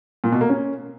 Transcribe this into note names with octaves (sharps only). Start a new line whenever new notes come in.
A#2
B2
A#3
C#4